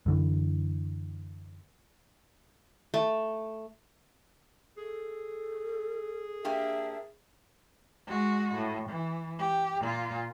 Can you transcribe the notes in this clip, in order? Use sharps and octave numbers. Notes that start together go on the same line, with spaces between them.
F#2 D3 E3
A3
G#4 A4
A#3 D4 G4 E5
G#3 F#4
A2
E3
G4
A#2 F4